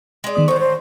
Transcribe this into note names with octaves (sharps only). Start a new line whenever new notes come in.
G#3 D5
D#3 B3 D#6
A2 F#3 C5 C#6
C5